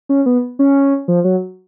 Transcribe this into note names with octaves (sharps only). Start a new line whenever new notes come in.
C#4
B3
C#4
F3
F#3